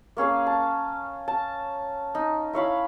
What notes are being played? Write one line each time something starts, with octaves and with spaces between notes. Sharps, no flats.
A#3 C#4 G#4 F5
A5
A5
D#4
E4 C#5 F5 B5